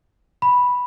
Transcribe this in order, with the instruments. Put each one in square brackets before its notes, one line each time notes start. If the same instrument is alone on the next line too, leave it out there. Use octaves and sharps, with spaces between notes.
[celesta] B5